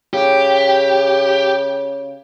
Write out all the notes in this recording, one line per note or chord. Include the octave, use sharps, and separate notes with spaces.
C#3 G4